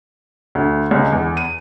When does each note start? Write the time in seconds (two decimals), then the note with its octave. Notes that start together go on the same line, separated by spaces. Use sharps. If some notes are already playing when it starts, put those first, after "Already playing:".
0.55 D2
0.91 C#2
1.12 E2
1.37 D#7